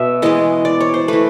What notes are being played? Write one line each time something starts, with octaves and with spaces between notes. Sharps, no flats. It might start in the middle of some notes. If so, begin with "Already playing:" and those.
Already playing: B2 B3 E5
E3 G#3 B3 D#5
D5
C#5
C5
E3 A3 B4